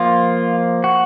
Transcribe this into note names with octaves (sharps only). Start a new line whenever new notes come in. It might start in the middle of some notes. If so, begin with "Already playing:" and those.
Already playing: F3 A#3 F4
F#4